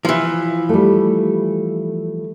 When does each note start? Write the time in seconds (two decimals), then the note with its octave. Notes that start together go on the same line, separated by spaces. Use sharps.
0.05 E3 F3
0.69 G3 A3